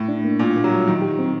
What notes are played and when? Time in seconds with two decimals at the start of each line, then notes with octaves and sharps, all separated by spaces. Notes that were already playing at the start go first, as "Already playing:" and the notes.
Already playing: A2
0.09 D4
0.25 A#3
0.39 A#2 D4
0.56 A#3
0.64 F#3
0.72 G3
0.87 D#3 F#3
1.02 G4
1.19 C4